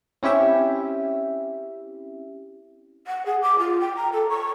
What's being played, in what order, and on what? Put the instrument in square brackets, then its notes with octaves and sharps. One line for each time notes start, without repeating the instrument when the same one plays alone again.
[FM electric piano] C4 C#4 E4 G4 E5
[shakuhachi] F#5
G#4
D6
F4
G5
A#5
A4
C#6